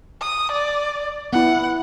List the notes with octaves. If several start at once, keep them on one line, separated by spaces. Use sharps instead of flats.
D#6
D5
B3 E4 F#5